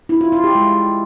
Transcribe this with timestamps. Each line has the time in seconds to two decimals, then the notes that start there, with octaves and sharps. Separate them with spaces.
0.09 E4
0.21 F4
0.32 F4
0.44 G4
0.55 G#3